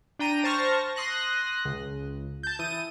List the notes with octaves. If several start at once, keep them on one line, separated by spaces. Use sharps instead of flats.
D4 G5 A#5 D#7
C5 A5 C#6 F6 A#6
C6 D#6 F#6 A#6
C#2
A5 G6
E3 D#6 D#7